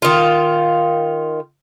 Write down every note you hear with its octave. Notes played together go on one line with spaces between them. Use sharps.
D#3 F4